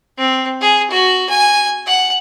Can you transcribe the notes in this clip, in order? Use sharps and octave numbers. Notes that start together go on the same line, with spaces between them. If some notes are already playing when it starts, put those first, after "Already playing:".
C4
G#4
F#4
G#5
F#5